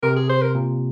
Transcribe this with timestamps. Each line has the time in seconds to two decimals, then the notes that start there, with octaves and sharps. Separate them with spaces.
0.03 C3 A#4
0.16 G#4
0.29 C5
0.42 A#4
0.55 A#2